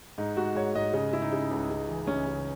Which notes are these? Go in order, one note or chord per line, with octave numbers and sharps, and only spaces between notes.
G#2 D#4
G#2 F#4
G#2 C#5
G#2 D#5
C#3 D#5
C#3 E4
D#4
C#3
C#2
C#3
E3
C#2 C#4
C#2